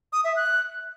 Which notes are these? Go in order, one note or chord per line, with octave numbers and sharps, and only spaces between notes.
D#6
E5
F#6